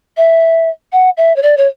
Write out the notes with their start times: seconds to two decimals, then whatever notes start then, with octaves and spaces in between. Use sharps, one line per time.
0.17 E5
0.92 F#5
1.17 E5
1.36 C#5
1.43 D5
1.57 C#5